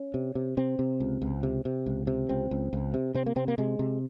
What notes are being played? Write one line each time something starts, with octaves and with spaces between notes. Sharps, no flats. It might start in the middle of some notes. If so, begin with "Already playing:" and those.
Already playing: C#4
C3
C3
C3 C4
C3
C#2
C#2
C3
C3
C#2
C3
C#2 C4
C#2
C#2
C3
C3 C4
A#3
C3 C4
A#3
C3 G#3
C3